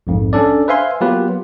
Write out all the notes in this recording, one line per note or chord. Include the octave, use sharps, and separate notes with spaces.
A#1 F2 G#2
C#4 D4 A4 D5
B4 C5 E5 F5 G#5 C6
F#3 A#3 B3 F4 G4 B4